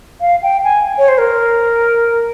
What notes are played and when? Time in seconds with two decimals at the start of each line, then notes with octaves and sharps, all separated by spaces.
0.21 F5
0.43 G5
0.64 G#5
0.98 C#5
1.08 C5
1.18 A#4